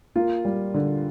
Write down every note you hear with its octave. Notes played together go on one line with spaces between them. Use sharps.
A#3 F4
G3
D3